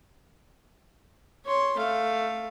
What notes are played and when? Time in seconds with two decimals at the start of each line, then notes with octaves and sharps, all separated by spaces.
1.46 C#5 C6
1.77 A3 F5